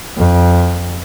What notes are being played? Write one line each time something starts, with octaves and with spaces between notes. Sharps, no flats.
F2